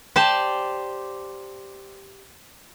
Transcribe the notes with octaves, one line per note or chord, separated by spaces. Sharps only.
G4 C5 D5 A5